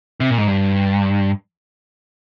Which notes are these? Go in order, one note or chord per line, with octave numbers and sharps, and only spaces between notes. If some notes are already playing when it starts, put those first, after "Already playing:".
C3
A#2
G#2
G2